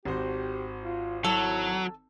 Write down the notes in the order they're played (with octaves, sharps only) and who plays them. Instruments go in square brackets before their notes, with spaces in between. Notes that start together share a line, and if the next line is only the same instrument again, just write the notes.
[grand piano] G#1 F#4 C5 [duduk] G4
[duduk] F4
[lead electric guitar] F#3 [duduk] E4 [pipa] A4